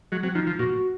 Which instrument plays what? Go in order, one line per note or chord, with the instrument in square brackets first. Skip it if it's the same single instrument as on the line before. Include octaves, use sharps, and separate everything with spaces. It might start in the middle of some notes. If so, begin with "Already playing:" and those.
[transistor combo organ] F#3 [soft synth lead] G#3
[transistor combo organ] F#3 [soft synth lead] C4
[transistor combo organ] F3 [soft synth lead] D#4
[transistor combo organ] F3
[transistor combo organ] A#2 [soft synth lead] F#4